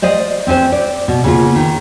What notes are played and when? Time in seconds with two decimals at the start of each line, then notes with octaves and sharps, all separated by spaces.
0.02 C5 D5 D#5 F5
0.47 C4 C#4 B4 C5
0.72 D5
1.08 B2
1.24 C#3 A#3 B3 F4
1.56 D#3